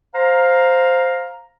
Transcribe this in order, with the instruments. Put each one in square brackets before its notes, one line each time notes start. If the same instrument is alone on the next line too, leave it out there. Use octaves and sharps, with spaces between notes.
[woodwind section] C5 F5 A#5